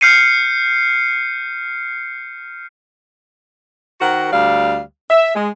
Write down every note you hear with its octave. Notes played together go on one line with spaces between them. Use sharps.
F6 G6 C7 C#7 D#7
D#3 F#4 A#4 C5 F#5
D2 G3 F5
E5
G#3